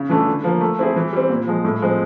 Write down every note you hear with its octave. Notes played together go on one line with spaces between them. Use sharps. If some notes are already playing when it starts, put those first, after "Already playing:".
Already playing: C#3
E3 A3 D4
D3
F3 A#3
A3
C4 E4 G#4
E3
G3 C4
A#2
F3 G#3
A2
F3 G#3 C4